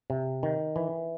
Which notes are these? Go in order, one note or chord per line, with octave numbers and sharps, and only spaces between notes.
C3
D#3
E3